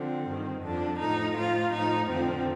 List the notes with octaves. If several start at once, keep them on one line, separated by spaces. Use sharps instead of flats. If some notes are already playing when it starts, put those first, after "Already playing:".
Already playing: D3 F3 C4
G2 D#3
F2 D3 F3 D4
A2 F3 D#4
A2 F3 F4
A2 F3 D#4
F2 D3 F3 C4